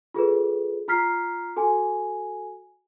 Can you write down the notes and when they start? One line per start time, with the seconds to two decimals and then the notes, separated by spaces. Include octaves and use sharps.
0.14 F4 G#4 A4 B4
0.88 F4 A#5 F6 B6 C7
1.57 F#4 A4 G#5